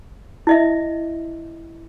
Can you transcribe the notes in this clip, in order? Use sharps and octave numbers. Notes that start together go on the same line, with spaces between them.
E4 D#5 E5